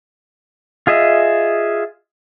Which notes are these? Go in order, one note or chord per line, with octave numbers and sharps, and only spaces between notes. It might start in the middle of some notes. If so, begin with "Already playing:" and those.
F4 G#4 D#5 E5